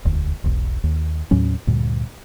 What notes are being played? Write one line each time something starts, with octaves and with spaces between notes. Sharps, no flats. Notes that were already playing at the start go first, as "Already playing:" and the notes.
E1 D2
E1 B1
D#2
D#2 A2 F#3 C#4
D2 G2 A#2